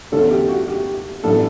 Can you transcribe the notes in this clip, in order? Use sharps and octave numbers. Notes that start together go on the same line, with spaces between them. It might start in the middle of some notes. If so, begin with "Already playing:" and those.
E2 D3 A3 C#4 A4
G4
F#4
G4
A1 A2 F#3 B3 D4 A4